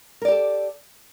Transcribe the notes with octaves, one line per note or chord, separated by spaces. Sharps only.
G4 A4 A#4 D5